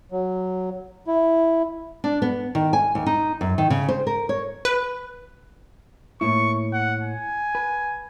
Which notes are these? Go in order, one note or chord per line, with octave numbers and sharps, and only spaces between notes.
F#3
E4
D4
B3
D#3
G#5
D#2
D#4
F#2
D#3
C#3
C5
A#4
C#5
B4
A2 A#3 E4 C#6
F#5
G#5
B4